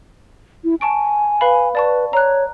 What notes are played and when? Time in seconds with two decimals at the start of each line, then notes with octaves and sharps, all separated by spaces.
0.64 E4
0.81 G#5 A5 C#6 D7
1.41 B4 F5 B5
1.75 B4 D5 A5 C#6
2.13 C#5 A#5 F#6